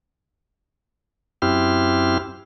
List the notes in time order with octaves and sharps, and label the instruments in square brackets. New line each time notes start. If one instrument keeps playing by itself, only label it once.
[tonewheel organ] F#2 C4 E4 G4 F6